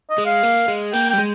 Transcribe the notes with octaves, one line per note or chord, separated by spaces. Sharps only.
D#5
G#3
F5
A#3
G#3
A#3 G5
G3 G5
G#3